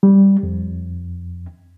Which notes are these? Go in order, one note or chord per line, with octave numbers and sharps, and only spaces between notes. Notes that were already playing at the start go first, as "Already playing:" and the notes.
G3
F2